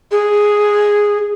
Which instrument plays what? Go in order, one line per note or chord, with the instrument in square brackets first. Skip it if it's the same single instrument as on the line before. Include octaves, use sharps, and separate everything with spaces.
[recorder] G#4